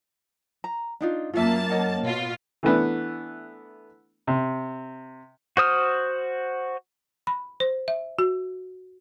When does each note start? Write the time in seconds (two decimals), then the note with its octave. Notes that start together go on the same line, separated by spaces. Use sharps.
0.64 A#5
1.01 D4 D#4 F4
1.34 F#2 A#3 F4 E5 A5
1.70 C#5 D#5 F#5
2.03 B2 F4
2.63 E3 A3 B3 D4
4.27 C3
5.57 F#4 C5 D#6 F6
7.27 B5
7.60 C5
7.88 E5
8.19 F#4